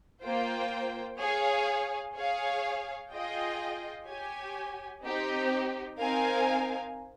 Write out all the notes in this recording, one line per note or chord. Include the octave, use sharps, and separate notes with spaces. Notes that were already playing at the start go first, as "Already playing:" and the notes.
A#3 F4 C5 G5
G#4 C#5 F5
G#4 C#5 F5
F4 G#4 D#5 G5
G4 C#5 G#5
C4 D#4 G4
C4 D#4 A#4 F5 G#5